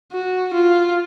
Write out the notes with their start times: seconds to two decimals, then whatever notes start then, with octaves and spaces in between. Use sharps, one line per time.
0.12 F#4
0.54 F4